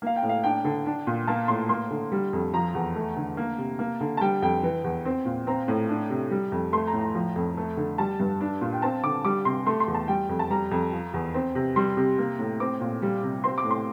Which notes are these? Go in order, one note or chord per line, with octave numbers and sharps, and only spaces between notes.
A#3 F5
G5
A2
F5
D4 G5
D3
D4
A#2
A#3 A5
A2 C6
A#3 C6
D3
G3
F2
F3 A#5
E2
A3
D3
A#3
C3
A#3
D3
A5
G3 G5
F2 G5
E3
E2
C4
A#2
C4 A#5
A2
D4
C3
G3
F2
A3 C6
A#5
A2
A#5
F3
F2
A3
D3
G3 A5
G2
D4
A#2
G5
C4 A5
D3 D6
G3 D6
C3 C6
A3 C6
C6
E2
A5
G3 G5
F2
A5
G3 A#5
F2
F3
E2
C4
C3
G3 C6
C3
A#3
A2
C4 D6
A#2
G3
C3
C4 C6
D6
A2
C6